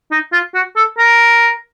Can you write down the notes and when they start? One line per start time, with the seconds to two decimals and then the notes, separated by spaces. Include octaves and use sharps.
0.11 D#4
0.33 F4
0.54 F#4
0.76 A4
0.98 A#4